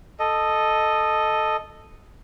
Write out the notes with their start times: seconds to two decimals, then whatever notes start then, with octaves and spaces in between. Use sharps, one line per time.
0.19 A4 D#5